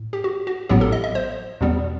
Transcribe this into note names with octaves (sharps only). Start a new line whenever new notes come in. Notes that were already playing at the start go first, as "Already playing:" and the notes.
Already playing: A2
G4
F#4
F#4
A1 A2 F#3 B3 G4
A4
D#5
D#5
C5
E2 B2 G3 B3